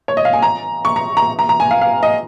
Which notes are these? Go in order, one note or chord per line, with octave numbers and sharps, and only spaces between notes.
C#5
D#5
F5
G#5
A#5
C#6
A#5
A#5
A#5
A#5
G#5
F5
F5
D#5